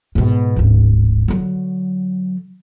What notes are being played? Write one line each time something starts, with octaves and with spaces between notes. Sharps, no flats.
G#2 B2
D1 G#1
D3 F#3